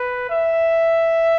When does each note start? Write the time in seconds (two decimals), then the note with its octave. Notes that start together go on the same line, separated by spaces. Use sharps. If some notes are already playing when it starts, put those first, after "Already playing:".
Already playing: B4
0.29 E5